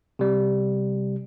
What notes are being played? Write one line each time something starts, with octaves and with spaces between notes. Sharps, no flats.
C3 G3